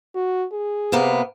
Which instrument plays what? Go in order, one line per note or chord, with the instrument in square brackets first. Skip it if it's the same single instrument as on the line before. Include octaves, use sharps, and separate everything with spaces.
[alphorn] F#4
G#4
[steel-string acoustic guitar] C3 A#3 B3